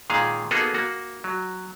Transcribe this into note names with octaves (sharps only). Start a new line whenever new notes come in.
A#2 D#3 G#3 G#4 F5
A#3 B3 D#4 F#4 G#4 A4
A#3 F#4
F#3